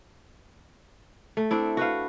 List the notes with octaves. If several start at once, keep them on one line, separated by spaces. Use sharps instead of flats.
A3
C4 D4 E4
F#4 B4 F5